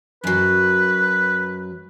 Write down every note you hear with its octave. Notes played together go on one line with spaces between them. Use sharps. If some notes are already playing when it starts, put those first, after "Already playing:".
F#2 F#3 B4